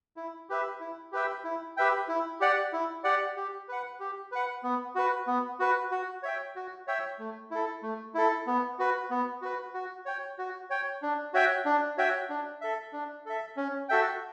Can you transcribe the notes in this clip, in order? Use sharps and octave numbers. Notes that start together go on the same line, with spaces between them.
E4
G4 B4 E5
E4
G4 B4 E5 G5
E4
G4 B4 E5 G5
E4
G4 D5 F#5
E4
G4 D5 F#5
G4
B4 F#5
G4
B4 F#5
B3
F#4 B4
B3
F#4 B4
F#4
C#5 E5 G5
F#4
C#5 E5 G5
A3
E4 A4
A3
E4 A4
B3
F#4 B4
B3
F#4 B4
F#4
C#5 G5
F#4
C#5 G5
D4
F#4 C#5 E5 G5
D4
F#4 C#5 E5 G5
D4
A4 E5
D4
A4 E5
C#4
F#4 A4 E5 G5